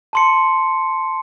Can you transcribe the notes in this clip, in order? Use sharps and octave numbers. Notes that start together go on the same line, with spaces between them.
A5 C6 C#7